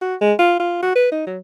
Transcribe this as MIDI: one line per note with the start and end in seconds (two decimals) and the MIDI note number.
0.01 0.15 66
0.21 0.33 56
0.39 0.56 65
0.59 0.80 65
0.82 0.95 66
0.95 1.11 71
1.12 1.26 63
1.27 1.38 54